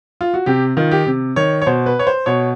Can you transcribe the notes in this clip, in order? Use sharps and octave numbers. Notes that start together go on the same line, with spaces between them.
F4
F#4
C3 G4
D#3 F4
G4
C3
D#3 C#5
C#5
B2 C5
B4
C#5
C5
B2 C#5